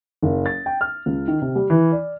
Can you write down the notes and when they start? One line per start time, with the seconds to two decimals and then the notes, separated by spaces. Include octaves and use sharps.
0.23 F#1
0.46 A6
0.66 G5
0.81 F6
1.06 C#2
1.28 D#3
1.42 C3
1.55 G3
1.70 E3
1.92 D5